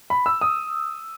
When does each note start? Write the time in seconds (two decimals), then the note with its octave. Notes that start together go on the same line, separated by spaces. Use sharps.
0.10 B5
0.26 E6
0.41 D#6